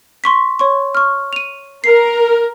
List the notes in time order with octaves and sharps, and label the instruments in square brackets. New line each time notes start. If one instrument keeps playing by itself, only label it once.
[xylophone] C6 C#6 B6
C#5 C6 C#6
C#6 F6
D#7 F7
[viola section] A#4 [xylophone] C7